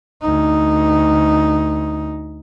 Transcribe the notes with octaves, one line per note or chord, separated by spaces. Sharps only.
D2 D#4